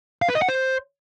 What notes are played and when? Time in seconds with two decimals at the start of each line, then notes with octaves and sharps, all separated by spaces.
0.22 F5
0.29 B4
0.35 D#5
0.42 F#5
0.49 C5